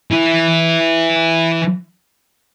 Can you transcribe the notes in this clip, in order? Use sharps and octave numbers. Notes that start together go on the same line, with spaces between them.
E3 E4